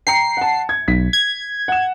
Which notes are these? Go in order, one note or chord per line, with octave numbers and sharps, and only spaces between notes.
G5 A#5 C7 C#7
F#5 A5
G#6
B1 B6
G#6
F#5 E7